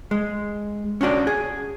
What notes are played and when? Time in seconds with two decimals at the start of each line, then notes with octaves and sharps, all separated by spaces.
0.11 G#3
1.01 C#4 D4 F#4 D5
1.27 G#4